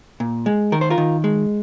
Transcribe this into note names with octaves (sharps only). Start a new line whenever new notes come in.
A#2
G#3
D#3 A#4
C5
F4 A#4
D#3
G#3